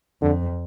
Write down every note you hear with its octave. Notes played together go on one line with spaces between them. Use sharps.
F2 D3